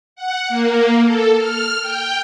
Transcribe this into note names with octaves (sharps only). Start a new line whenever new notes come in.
F#5
A#3
A4
F6
G5